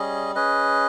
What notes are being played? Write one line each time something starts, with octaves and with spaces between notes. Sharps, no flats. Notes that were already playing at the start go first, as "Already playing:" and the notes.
Already playing: G3 C#4 G#4 D#5
C#4 G#4 B4 D#5